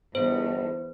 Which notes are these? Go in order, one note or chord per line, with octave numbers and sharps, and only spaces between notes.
G1 E2 C5